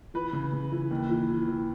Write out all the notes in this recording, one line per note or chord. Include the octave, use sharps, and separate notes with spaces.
E3 B4
C#3
C#3
E3
D#2
E3
E3
E3